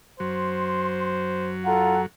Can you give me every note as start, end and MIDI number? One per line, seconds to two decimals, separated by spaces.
0.20 2.06 42
0.20 2.06 54
0.20 1.53 72
0.20 1.15 84
1.65 1.96 65
1.65 2.01 69
1.65 2.01 78
1.65 2.01 82